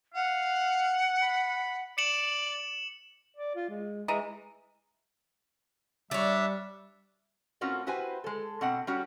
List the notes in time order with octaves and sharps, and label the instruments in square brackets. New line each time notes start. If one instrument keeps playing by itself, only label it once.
[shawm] F5 [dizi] F#5
[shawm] B5
[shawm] D5 [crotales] C#7 E7 F#7
[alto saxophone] D5
F4
G#3
[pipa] E3 D#5 A#5 [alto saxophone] G#3
[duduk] G3 [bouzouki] D4 C#5 [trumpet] E5
[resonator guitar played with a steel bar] A2 C4 C#4 F4 F#4 A#4
E4 F#4 G4 B4 C5 G#5
G#3 A4
B2 C4 F#5
G3 C#4 F#4